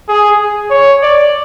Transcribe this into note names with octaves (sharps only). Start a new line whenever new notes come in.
G#4
C#5
D5